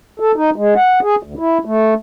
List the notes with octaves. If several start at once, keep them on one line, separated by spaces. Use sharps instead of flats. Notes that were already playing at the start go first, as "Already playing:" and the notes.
A4
D#4
G#3
F#5
G#4
D2
E4
A3